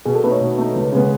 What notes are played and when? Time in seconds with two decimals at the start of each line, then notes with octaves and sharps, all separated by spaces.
0.05 B2 G#4
0.15 A4
0.23 A3 D#4 B4
0.32 C#5
0.41 B2
0.58 A3 D#4
0.76 C#2
0.92 C#3 G#3 B3